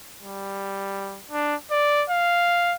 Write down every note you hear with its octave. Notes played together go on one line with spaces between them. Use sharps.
G3
D4
D5
F5